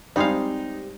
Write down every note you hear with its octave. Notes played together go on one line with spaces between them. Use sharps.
G3 G#3 C4 D#4 G4 F5